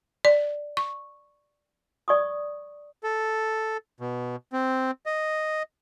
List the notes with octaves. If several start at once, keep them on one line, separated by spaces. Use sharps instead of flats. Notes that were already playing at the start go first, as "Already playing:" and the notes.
D5
C#6
D5 C#6 D#6
A4
B2
C4
D#5